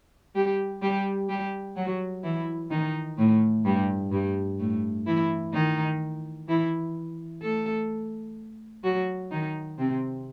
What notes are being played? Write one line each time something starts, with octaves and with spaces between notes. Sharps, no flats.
G3 G4
G3 G4
G3 G4
F#3 F#4
E3 E4
D#3 D#4
A2 A3
G2 G3
G2 G3
A2 A3
E3 E4
D#3 D#4
E3 E4
A3 A4
F#3 F#4
D#3 D#4
C3 C4